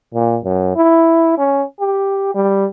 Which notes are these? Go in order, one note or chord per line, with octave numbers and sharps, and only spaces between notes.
A#2
F#2
E4
C#4
G4
G3